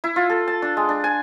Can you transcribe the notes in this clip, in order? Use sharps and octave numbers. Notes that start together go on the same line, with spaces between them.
E4
F4
A4
A5
D4
G#3
D4
G#5